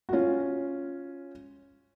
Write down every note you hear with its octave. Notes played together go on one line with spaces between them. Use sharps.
F#4
C#4 F4